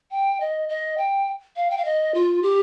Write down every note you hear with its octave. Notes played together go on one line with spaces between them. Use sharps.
G5
D#5
D#5
G5
F5
G5
F5
D#5
F4
G4